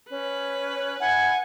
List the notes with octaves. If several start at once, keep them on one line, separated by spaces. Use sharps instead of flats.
C#4 B4
E4 F#5 G#5